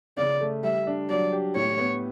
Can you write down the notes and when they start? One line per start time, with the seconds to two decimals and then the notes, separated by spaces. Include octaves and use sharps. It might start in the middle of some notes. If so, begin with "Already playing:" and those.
0.17 C#3 D5
0.41 A3
0.63 G3 E5
0.87 D4
1.10 F#3 D5
1.32 G4
1.56 A2 C#5
1.79 B3